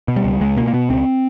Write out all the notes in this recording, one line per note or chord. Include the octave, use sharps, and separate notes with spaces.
B2
G3
C#2
C#2 G#3
B2 A#3
A#3
B2 B3
C#2 C4